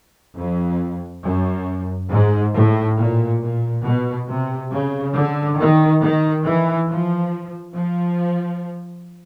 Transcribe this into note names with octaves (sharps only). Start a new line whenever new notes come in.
F2
F#2
G#2
A2
A#2
A#2
B2
C3
C#3
D3
D#3
D#3
E3
F3
F3